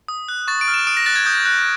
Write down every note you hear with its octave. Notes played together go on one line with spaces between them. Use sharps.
D#6
F#6
C#6 A6
D7
F6
E7
D#6 D7
A#6
F#6 A6
G#6
D#6 G6
F#6